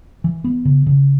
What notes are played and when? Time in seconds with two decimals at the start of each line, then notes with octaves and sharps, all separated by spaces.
0.24 E3
0.44 B3
0.65 C#3
0.86 C#3